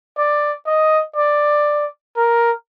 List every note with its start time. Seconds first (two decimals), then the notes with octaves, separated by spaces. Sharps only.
0.18 D5
0.66 D#5
1.17 D5
2.17 A#4